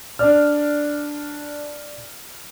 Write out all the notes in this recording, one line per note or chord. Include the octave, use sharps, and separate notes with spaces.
D4 D5 F6